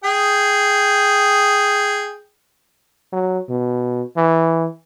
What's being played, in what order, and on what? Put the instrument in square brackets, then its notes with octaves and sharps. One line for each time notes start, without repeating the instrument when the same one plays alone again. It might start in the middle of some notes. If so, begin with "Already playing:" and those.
[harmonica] G#4 G5
[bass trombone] F#3
B2
E3